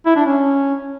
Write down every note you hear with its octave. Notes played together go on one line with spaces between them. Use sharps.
E4
D4
C#4